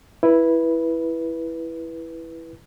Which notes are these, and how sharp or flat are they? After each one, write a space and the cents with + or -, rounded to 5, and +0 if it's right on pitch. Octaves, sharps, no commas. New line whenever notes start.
E4 +0 B4 -10